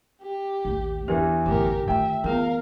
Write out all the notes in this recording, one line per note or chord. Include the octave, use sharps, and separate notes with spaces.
G4
A1 D#2
E2 E3 C4 D4 G4
A1 F#2 A2 D3 G4 A#4 B4
D#3 A3 F4 E5 G5
E3 B3 F4 G#4 A#4 F5